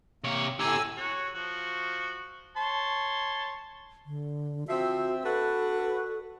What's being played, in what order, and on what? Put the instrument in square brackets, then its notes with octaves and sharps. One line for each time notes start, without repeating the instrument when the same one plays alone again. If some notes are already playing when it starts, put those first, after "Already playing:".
[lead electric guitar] C3 C#5 [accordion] A#3
[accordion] A2 G#5 E6 [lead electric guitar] G4 A#5
[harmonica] F#4 C#5
F3 F#4
C#5 A5 C6
[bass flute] D3
[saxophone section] F3 C4 E5 [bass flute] F#4
[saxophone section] D4 F#4 B4 [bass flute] A4